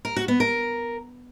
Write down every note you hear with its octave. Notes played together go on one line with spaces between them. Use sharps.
A#4
F#4
B3
A#4